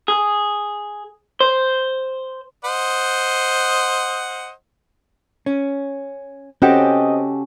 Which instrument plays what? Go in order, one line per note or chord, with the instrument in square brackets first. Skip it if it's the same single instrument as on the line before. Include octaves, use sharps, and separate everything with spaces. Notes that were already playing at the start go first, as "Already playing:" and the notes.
[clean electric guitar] G#4
C5
[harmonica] C5 D#5 F#5
[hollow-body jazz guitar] C#4
[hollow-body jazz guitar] C4 [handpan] C#4 [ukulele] F#4 G4 A4 [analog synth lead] D#5